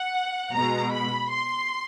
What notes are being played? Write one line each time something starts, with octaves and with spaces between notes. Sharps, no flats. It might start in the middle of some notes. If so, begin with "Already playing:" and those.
Already playing: F#5
B2 G#3 A#5
B5
C6